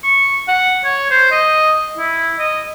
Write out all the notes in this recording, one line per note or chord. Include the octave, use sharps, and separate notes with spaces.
C#6
F#5
C#5
C5
D#5
E4
D#5